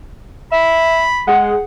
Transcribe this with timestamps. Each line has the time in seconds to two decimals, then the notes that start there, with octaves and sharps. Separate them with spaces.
0.52 E5 B5
1.27 G#3 G#4 F#5